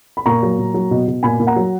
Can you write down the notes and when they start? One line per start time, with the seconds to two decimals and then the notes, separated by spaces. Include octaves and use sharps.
0.17 B5
0.26 A#2 A#5 C#6
0.43 F#3
0.58 A#2
0.74 F#3
0.91 B2
1.08 B2
1.23 A#2 G#5 B5
1.40 A#2
1.47 F#5 A#5
1.56 F#3